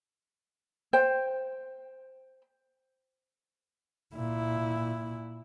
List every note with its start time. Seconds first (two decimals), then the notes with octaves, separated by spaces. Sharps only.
0.93 C5 G5
4.15 A#2 E4